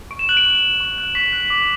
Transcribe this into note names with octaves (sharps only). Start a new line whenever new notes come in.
C#6 D7
E7
F#6 F#7
D7
C#6
F#6
C#6
F#6
C#6 B6
F#6
D6